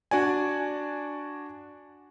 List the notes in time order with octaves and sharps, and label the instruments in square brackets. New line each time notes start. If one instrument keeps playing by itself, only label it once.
[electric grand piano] D4 F#4 D5 G#5